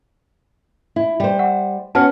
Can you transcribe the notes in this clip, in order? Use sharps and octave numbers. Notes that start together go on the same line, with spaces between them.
E4
G3 C5
F#5
B3 C#4 F#4 A5 F6